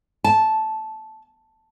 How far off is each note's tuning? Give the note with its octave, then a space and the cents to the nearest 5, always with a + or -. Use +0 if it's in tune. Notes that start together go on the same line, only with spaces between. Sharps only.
A5 -10